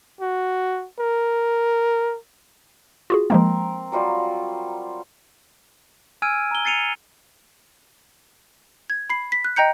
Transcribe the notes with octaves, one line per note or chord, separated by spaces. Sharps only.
F#4
A#4
F4 F#4 G#4
F3 G#3 A#3 C4 A#4
F#3 G3 F4
G#5 E6 F6 G#6 D7 D#7
A#5 G7
A6 C7 C#7 D#7 F7
G#6
B5 C7
B6
F#6
D#5 G5 A#5 G6 C#7